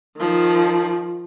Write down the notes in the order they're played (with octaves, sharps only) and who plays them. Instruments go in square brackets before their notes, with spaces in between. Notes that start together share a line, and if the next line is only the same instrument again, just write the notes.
[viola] D#3 F3